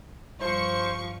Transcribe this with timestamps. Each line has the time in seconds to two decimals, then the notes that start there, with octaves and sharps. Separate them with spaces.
0.41 G2 F3 C5 C#6